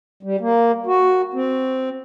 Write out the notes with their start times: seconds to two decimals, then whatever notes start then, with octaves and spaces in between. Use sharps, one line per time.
0.23 G3
0.40 A#3
0.86 F#4
1.34 C4